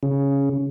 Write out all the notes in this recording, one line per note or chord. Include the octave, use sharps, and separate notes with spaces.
C#3